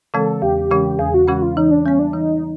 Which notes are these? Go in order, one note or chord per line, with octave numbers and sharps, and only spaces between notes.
C#3 E3 G#3 C4 A4
E2 G4
C#3 E3 G#3 C#4
E2 G#4
F#4
C#3 E3 G#3 C#4 F#4
F4
E3 D#4
D4
G3 B3 C#4
D4
E3 D#4